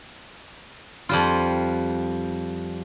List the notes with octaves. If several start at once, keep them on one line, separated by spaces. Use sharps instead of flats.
F2 G3 F4